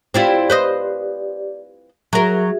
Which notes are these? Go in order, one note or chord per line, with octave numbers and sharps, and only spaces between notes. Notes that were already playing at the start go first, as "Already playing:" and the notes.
C4 E4 F4 G4 D5
B4 C5 D#5
F#3 F#4 G#4 A#4 E5